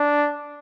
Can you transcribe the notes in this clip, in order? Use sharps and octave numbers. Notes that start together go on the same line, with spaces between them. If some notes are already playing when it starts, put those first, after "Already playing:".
Already playing: D4